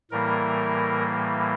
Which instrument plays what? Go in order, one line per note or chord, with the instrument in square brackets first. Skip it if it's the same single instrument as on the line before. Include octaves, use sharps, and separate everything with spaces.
[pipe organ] A2 E3 G3 A#3 A#4